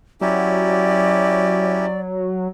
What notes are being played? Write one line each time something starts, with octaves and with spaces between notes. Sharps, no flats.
F#3 C#4 E4 G4 D5